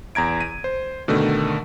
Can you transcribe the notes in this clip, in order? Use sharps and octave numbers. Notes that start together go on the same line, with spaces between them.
E2 A#5 G#6 D7
D#7
C5
B2 D3 D#3 A3